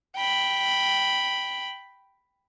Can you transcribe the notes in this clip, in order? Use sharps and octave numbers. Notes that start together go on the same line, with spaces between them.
G5 B5